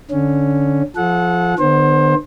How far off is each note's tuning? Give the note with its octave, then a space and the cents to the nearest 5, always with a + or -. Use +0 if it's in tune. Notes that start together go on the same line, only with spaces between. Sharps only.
D3 -5 C#4 +0
F3 +0 A4 -35 F#5 -20
D3 +40 B3 +0 C5 +25